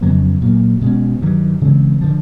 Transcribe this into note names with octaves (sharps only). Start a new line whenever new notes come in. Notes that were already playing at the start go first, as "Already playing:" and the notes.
F2 C#3 F#3 B3
A#2 F#3 A#3
B2 G#3 C#4
G2 D#3 F#3
C#3 E3 G#3 C4
D3 F3